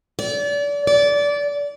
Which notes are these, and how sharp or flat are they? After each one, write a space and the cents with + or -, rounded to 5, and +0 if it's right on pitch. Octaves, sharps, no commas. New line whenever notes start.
D5 -35
D5 -25